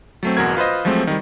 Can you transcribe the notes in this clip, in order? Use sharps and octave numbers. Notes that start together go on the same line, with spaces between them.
F#3 A3 C4
G1 E2 B2 F#4 A#4 G#6
F4 B4 C5 D#5
F3 F#3 G#3 A3 C4
D#3 G3